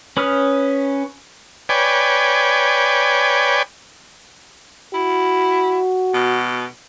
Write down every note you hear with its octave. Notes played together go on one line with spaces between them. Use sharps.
C#4 B4 D#6 F6
B4 C#5 D5 G5 G#5
E4 F#4
B2